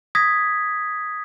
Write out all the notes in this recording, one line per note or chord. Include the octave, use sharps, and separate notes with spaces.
D#6 G#6 A#6 B6